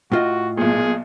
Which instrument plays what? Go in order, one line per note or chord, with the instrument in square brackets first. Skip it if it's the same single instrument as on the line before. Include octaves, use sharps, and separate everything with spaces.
[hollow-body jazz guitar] A2 F4 D#5 [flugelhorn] F#4
[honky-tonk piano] B1 A#2 [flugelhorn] G#4